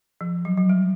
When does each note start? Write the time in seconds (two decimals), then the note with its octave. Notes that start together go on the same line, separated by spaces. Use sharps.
0.21 F3
0.45 F#3
0.57 F#3
0.69 G3